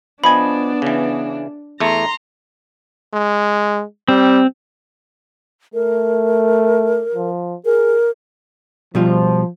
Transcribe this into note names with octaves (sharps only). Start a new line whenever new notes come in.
F3 B3 D4 D#5 G#5 B5
C#3 E3
E2 A3 A#5 C6
G#3
G3 C4
A3 A#4
F3
G#4 A#4
B2 F3 G3 F4